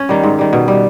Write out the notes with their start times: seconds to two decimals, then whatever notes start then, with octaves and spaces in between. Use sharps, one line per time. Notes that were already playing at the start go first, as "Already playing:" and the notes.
Already playing: C#4
0.09 D#3 G3
0.23 G#2
0.39 D#3 G3
0.53 B2
0.68 G3